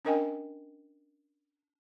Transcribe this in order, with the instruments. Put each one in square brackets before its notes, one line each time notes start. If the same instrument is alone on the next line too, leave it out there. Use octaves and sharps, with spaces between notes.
[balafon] C#4 D4 A#4 D#5 G5 G#5